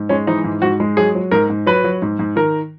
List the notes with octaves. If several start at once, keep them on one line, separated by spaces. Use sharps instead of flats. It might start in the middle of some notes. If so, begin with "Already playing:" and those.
Already playing: G#2
G#3 C#4
E3 D#4
G#2
G#2 F#4
G#3
F#3 G#4
F#3
G#2 A#4
G#2
F#3 B4
F#3
G#2
G#2
D#3 A#4